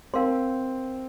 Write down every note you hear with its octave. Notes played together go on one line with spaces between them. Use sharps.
C4 D#4 A#4 F5 C6